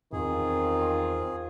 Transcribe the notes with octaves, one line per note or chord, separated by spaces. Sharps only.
E2 D#3 C4 F4 G#4